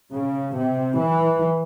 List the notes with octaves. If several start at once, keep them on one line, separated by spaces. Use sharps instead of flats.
C#3
C3
E3